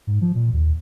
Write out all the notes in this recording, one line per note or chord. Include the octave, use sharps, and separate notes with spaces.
G#2
F3
A#2
D#2